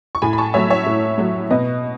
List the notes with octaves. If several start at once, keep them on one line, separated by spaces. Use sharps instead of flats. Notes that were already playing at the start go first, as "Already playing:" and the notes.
C#6
A2 G#5 B5
B5
A5 C#6
F#3 A3 C#5 E5
C#5 E5
A2
F#3 A3
B2 B4 D#5